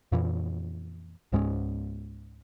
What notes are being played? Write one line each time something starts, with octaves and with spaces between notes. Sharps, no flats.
F2 A#2 E3
C#2 G#2 G#3 C#4